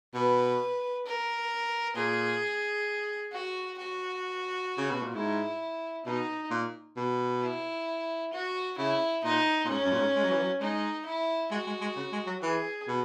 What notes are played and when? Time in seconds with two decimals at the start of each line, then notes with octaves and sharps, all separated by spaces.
0.14 B2 B4
1.05 A#4
1.96 A#2 G#4
3.32 F#4
3.78 F#4
4.78 C#3
4.90 B2
5.02 A#2
5.14 G#2 E4
6.05 B2 D#4
6.51 A#2
6.97 B2
7.42 E4
8.32 F#4
8.78 C#3 E4
9.24 A#2 D#4
9.65 A#2
9.69 G#2 C#4
9.85 F#2
9.92 A#2
10.00 G#2
10.15 G#3
10.23 F#3
10.31 E3
10.40 F#3
10.61 G#3 D#4
11.05 E4
11.51 G#3 F#4
11.67 G#3
11.81 G#3
11.96 C#3
12.12 G#3
12.27 F#3
12.42 E3 G#4
12.88 B2